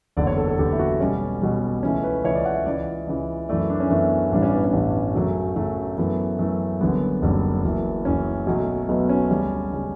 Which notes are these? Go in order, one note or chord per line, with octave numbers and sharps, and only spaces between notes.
F#1 E2 D3 D5
C#5
A4
A4
F#1 E2 D3 G4
E4
F#4
B1 B2 G3 C#4
B1 B2 G3
C#2 C#3 E3 A3 C#4
B4
C#2 C#3 E3 A3 C#5
D5
F#5
E5
C#2 C#3 E3 D5
C#2 C#3 E3
F#2 E3 A3 D5
E4
D4
C#4
F#2 E3 A3 B3
A1 G2 E3 G3 D4
C#4
B3
C#4
A1 G2 E3 G3
F#2 C#3 F#3 A3
F#2 C#3 F#3 A3
F#2 E3 A3 B3
F#2 E3 A3
F#1 F#2 D3 G3 B3
F#1 F#2 D3 G3
F#1 F#2 E3
F#1 F#2 E3 C#4
B1 B2 F#3 A3
B1 B2 F#3 A3 B3
C#4
D2 C#3 G3
C#3 G3